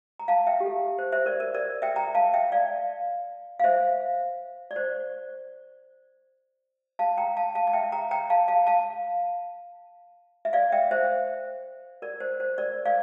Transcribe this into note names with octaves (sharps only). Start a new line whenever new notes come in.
A#5
F5 A5
E5 G5
G4
A4
C5
C5 E5
A#4 D5
A#4
A#4 D5
E5 G5
G5 A#5
F5 A5
E5 G5
D5 F5
F5
C5 E5
D5
C5
F5 A5
G5 A#5
F5 A5
F5 A5
A5
E5 G5
G5 A#5
G5 A#5
F5 A5
F5 A5
F5 A5
E5
D5 F5
E5 G5
C5 E5
A#4 D5
C5
C5
A#4 D5
D5 F5